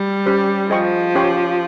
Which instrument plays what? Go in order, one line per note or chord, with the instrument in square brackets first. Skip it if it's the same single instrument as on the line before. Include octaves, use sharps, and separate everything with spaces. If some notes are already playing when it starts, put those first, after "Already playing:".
Already playing: [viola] G3
[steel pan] C#4 G4 C5
[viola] F3 [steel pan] G#4 C5 D#5 G5 C#6
[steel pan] C#4 G4 C#5 G5 C6